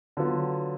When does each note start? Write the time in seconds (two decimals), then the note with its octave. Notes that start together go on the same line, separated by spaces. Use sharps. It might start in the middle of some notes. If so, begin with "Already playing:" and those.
0.17 D3 F#3 B3 F4